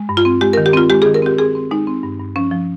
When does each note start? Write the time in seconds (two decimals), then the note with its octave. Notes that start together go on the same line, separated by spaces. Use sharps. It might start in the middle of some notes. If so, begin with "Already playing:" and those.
Already playing: G#3
0.09 G2
0.17 F4
0.25 C4
0.41 G#3 G4
0.53 A#4
0.58 D#3
0.66 G4
0.73 C4 F4
0.90 G#3 G4
1.02 G#4
1.06 D#3
1.14 A#4
1.22 C4 G4
1.39 C4 G#4
1.55 C4
1.71 G#3 D#4
1.87 C4
2.03 G2
2.20 G2
2.36 F3 C#4
2.51 F3